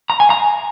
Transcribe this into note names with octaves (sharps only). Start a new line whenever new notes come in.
A#5
G#5
A#5